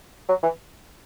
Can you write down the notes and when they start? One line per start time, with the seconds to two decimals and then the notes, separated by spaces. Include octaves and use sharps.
0.29 F#3
0.43 E3